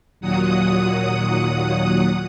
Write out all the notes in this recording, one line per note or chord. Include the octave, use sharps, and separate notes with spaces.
D#2 A#2 F#3 F#5 D#6